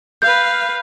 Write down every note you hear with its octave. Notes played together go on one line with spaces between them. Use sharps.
B4 F5 G6